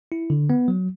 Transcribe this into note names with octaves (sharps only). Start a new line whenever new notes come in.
E4
D3
B3
F#3